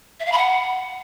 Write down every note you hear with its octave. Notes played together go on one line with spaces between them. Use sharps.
E5
F5
B5
F#5